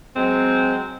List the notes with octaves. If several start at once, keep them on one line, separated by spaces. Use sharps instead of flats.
F#3 G#3 C4